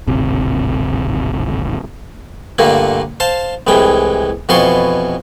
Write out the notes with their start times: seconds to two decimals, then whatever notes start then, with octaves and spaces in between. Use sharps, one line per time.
0.07 D1 G#1 C3
2.59 G2 A#2 D3 A3 A#3
3.20 C5 F5 A5
3.67 C2 A2 E3 G#3 G5
4.49 F2 B2 E3 F4 C6 C#6